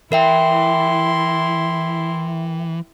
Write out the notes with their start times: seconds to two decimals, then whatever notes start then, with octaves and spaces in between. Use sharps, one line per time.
0.12 E3 E4 A#4 E5 G5 C6